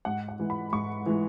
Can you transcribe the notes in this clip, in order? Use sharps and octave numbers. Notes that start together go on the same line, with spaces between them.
G#2 F#5
F#5
E3 G#3
B5
G#2 C#6
E3 G#3